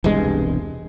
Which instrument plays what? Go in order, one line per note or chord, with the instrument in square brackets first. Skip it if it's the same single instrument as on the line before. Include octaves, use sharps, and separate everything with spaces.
[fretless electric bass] E1 C2 G2 G#3